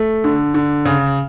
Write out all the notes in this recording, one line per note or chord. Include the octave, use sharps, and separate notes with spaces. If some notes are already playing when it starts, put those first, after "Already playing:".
Already playing: A3
D3
D3
C#3